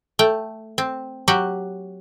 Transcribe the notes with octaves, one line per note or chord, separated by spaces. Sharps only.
A3 G5
C4
F#3 F#4 G4